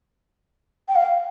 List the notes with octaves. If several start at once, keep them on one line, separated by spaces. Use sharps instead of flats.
G5
F5